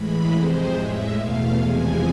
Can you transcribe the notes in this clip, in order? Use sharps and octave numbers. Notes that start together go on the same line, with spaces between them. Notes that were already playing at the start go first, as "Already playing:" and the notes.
Already playing: A2 E3 G#3 B5
F2 C3 G#3 C5
A2 G#3 E5
E2 B2 A3 F5
E2 C3 F3 G#3 G#5